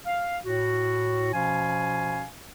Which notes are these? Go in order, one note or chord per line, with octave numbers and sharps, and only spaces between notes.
F5
A2 F#4
B2 F3 C#4 F5 G#5